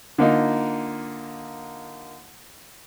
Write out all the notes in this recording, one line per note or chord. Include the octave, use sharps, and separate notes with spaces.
D3 A#3 D#4 F4